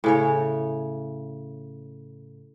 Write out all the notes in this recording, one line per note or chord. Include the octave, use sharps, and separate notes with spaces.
A2 C#3 C#5